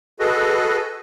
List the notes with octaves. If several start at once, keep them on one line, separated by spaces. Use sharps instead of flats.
F#4 G#4 A4 B4 D#5